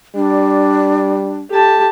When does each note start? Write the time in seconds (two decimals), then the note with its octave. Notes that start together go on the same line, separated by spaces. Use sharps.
0.15 G3 D4
1.50 G4 A4 A5